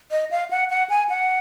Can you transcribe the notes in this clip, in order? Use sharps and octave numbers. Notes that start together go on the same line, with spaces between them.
D#5
F5
F#5
F#5
G#5
F#5